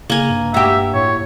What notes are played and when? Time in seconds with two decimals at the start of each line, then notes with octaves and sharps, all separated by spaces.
0.10 C#3 A#3 G#5
0.30 G2
0.54 F#4 G4 E5
0.94 A2 C#5